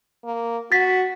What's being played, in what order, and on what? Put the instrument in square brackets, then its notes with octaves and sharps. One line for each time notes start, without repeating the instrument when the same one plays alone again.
[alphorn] A#3
[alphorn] F#4 [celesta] A6 B6